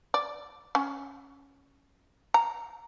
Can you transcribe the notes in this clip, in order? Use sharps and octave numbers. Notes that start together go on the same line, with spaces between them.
D5
C#4
A#5